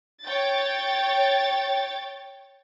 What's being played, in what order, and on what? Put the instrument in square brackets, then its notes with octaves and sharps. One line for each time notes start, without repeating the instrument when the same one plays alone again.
[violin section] C#5 G5 A6